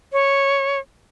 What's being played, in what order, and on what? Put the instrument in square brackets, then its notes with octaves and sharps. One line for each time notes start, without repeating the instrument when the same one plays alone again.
[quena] C#5